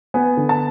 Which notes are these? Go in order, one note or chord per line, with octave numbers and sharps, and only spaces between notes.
B3 G#5
D3
A5